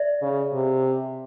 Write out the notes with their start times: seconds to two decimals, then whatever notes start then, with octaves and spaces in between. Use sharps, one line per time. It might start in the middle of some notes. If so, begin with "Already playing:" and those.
Already playing: D5 E5
0.22 C#3
0.53 C3